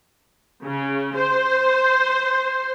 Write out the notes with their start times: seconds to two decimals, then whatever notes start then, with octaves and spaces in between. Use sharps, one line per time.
0.65 C#3
1.17 C5